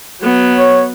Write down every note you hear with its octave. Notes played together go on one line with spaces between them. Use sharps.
F#3 B3
C#5